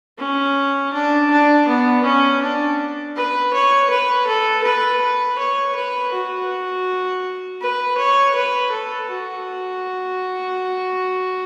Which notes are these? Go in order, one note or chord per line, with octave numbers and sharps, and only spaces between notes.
C#4
D4
D4
B3
C#4
D4
B4
C#5
B4
A4
B4
B4
C#5
B4
F#4
B4
C#5
B4
A4
F#4